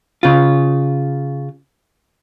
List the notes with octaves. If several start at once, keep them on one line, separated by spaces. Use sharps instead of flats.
C#3 F4